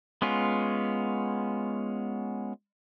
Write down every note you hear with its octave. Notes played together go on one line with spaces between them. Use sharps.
G#3 B3 C#4 F4